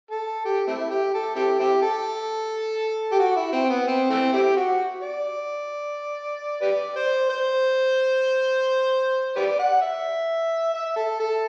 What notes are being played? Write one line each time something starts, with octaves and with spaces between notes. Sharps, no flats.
A4
G4
A3 C4 E4
G4
A4
C4 E4 G4
C4 E4 G4
A4
G4
F#4
E4
C4
B3
C4
E3 A3 C4
C4 E4 G4
F#4
D5
G4 B4 D5
C5
C5
G4 B4 D5
F#5
E5
E5
A4
A4